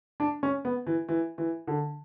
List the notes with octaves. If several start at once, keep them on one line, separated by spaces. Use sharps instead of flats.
D4
C#4
B3
E3
E3
E3
D3